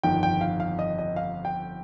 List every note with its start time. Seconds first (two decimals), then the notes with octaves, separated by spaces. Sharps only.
0.03 G1 F2 D#3 G5
0.23 G5
0.41 F5
0.60 F5
0.79 D#5
0.98 D#5
1.16 F5
1.45 G5